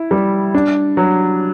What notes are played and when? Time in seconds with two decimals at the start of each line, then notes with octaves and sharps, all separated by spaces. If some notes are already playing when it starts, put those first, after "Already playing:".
Already playing: E4
0.11 G3
0.54 D4
0.97 F#3